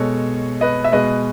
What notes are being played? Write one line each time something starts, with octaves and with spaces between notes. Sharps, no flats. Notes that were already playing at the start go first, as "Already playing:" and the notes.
Already playing: B2 G#3 A4 C#5
B4 D#5
E5
B2 G#3 B4 D#5